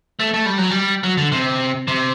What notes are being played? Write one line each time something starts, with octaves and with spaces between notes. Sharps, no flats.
A3
A3
G3
F#3
G3
F#3
D3
C3
C3